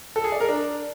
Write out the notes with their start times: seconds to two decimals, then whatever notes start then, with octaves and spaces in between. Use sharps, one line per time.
0.16 A4
0.24 G#4
0.32 D5
0.40 A#4
0.49 D4